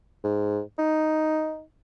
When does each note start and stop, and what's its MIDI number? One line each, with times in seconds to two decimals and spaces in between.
0.24 0.60 44
0.78 1.62 63